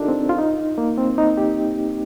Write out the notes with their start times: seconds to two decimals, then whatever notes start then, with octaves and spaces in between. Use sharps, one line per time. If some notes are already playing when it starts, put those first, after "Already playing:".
Already playing: D4 D#4 F4 G4 A4 A#4
0.08 C4
0.29 F4
0.38 D#4
0.78 A#3
0.98 C4
1.18 D#4
1.37 G4